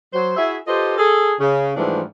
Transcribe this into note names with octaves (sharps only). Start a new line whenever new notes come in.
F#3 C5
E4 F#4 G#4 E5
F4 G4 A4 B4 C5 D#5
G#4 A4
C#3
G#2 E3 F3 G3 A3 D4